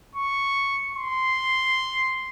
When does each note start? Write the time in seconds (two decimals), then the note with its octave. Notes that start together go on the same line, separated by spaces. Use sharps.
0.15 C#6
0.94 C6